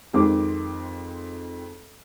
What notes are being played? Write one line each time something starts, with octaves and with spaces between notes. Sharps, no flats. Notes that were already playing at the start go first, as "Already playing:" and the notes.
F2 D#3 G#3 C4 D6